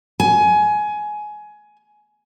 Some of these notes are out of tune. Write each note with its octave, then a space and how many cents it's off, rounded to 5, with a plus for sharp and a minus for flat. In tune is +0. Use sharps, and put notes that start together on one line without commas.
G#5 +20